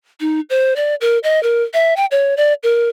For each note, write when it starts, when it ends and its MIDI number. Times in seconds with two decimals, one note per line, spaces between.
0.21 0.40 63
0.50 0.74 72
0.76 0.95 74
1.01 1.18 70
1.24 1.42 75
1.43 1.63 70
1.74 1.94 76
1.97 2.06 79
2.11 2.34 73
2.37 2.54 74
2.63 2.89 70